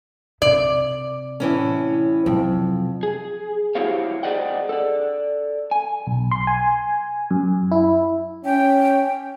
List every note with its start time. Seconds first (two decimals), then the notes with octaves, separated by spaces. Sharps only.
0.42 C3 D5
1.40 A2 E3 C#4
2.26 F2 C3 F#3
3.03 G#4
3.75 E4 F#4 G4 C5 C#5 F5
4.23 G#4 C5 D5 D#5 F#5 G5
4.69 A4 D5
5.71 G#5
6.07 B1
6.31 C6
6.47 G#5
7.31 F#2
7.72 E4
8.45 C#4 G5